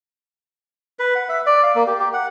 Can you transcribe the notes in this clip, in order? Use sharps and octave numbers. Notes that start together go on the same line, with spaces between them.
B4
F#5
E5
D5
F5
A#3
G4
G4
F#5